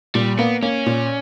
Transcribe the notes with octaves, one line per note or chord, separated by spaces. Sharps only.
A#2 G3
A#3 B3
A#3 C#4
A#2